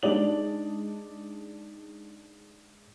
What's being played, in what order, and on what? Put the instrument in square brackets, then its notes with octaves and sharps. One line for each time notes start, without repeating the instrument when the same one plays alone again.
[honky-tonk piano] G#3 D4 D#4 D5 F#7